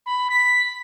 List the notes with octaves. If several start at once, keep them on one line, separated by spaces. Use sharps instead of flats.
B5
B6